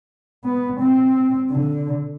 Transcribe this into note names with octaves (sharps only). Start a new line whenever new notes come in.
B3
C4
D3